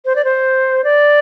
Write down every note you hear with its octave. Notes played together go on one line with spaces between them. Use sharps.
C5
D5
C5
D5